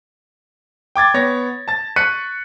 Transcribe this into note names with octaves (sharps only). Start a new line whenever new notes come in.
G5 D6 G#6 A6
B3 C#5 A#6
A5 A6
C#6 F#6 B6 C#7 D#7